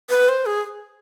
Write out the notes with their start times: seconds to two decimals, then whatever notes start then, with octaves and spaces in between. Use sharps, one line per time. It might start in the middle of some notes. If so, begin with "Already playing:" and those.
0.10 B4
0.29 C5
0.46 G#4